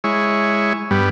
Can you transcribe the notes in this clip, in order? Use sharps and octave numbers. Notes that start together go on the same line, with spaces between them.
G#3 E4 C#5
G2 G3 B3